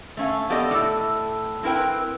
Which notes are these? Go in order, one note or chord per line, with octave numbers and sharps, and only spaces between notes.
A3 C#4 F5
B3 G4 A4 D5 D#5
A2 A4
C4 E4 A#4 B4 G5